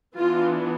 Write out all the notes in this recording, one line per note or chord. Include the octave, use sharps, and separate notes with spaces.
E3 B3 D4 F4